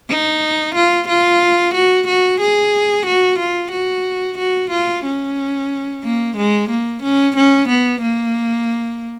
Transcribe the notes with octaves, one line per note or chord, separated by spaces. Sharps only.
D#4
F4
F4
F#4
F#4
G#4
F#4
F4
F#4
F#4
F4
C#4
A#3
G#3
A#3
C#4
C#4
B3
A#3